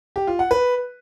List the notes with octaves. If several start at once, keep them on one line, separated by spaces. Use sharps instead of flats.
G4
F4
F#5
B4